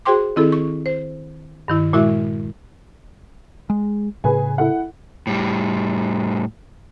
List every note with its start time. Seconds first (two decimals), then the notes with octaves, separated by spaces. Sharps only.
0.05 F#4 G#4 C5 G5 C6 D6
0.36 D#3 C4 E4 G#4 A4
0.52 C#6
0.86 C5
1.68 G2 D#3 E4
1.93 A#2 G#3 E4 F#4 E5 C#6
3.70 G#3
4.24 A2 C#3 G#4 B4 G#5
4.58 E4 A4 F#5
5.27 A2 G3